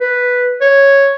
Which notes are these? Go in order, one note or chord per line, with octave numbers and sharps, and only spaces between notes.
B4
C#5